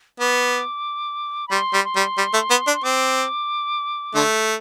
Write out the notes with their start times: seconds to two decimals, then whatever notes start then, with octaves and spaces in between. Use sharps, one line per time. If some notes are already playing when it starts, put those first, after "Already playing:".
0.20 B3 D6
1.48 B5
1.51 G3 C6
1.74 G3
1.85 C6
1.96 G3
2.18 G3
2.33 A3
2.50 B3
2.67 D4
2.74 C6
2.83 C4 D6
4.15 D3 A3